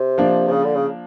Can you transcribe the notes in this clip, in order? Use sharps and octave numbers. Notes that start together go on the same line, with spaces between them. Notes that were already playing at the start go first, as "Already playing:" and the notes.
Already playing: C3
F3 A#3 D4
C3
C#3
D3
C#3